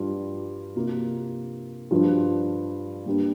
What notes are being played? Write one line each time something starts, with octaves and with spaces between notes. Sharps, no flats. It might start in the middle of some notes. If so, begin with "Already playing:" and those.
Already playing: G2 G3 D4 F4
C3 A#3 F4
G2 F3 D4 F4
G2 G3 A#3 D4